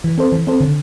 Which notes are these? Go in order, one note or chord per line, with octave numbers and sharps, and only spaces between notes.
E3
C4 A4 C5
E3
C4 A4 C5
D3